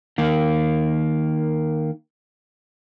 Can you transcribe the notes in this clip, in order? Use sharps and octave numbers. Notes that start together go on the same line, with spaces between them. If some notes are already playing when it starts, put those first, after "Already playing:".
D#3 A#3